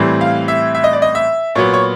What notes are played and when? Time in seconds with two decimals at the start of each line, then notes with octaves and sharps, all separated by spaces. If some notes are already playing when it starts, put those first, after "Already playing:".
Already playing: A2 E3 G3 C4
0.21 F5
0.48 E5
0.75 E5
0.84 D#5
0.93 D5
1.02 D#5
1.15 E5
1.55 A#2 F#3 B3 C#5
1.74 C#5